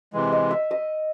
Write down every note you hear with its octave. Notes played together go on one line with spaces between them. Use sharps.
C3 E3 G#3
D#5
E5
D#5